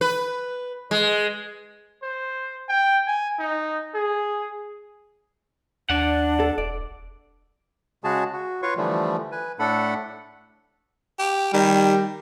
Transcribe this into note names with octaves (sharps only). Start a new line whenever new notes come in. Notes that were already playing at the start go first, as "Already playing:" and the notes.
B4
G#3
C5
G5
G#5
D#4
G#4
D#2 D4 D5 F#5
A4
E1 D5
C#3 G#3 F#4 G#4 A5
F#4
F4 B4 C#5 F5 C#6
D3 E3 F3 G3 A3
B4 G#5
A2 A3 D4 A4 F#5 B5
G4
D#3 G3